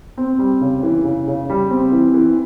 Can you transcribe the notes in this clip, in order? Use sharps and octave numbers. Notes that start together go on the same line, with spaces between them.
C4
G3
C#3
E3
C#3
C#3
G3
C4
E3
E3